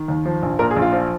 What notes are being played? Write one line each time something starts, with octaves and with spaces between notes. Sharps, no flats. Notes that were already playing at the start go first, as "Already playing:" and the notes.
Already playing: D#3
D#2
F3
A#1
A#2 A#4
G#4
A#1
F4
F3